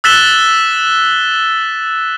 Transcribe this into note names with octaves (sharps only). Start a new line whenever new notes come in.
E6 F#6 A6 B6 E7 G7